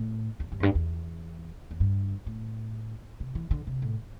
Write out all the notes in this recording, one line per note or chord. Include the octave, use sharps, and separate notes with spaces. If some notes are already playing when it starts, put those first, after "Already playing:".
Already playing: A2
E2
G2
E2
G2
E2
E2
G2
A2
C3
E3
D3
C3
A2